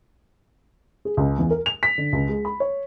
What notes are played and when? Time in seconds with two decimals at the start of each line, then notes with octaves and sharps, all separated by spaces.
1.05 G#4
1.17 C#2
1.39 E2
1.51 A#4
1.66 F7
1.83 B6
1.98 D3
2.13 C#2
2.28 G#3
2.45 B5
2.60 C#5